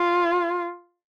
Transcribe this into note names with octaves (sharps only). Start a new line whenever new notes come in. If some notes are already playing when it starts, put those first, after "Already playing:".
Already playing: F4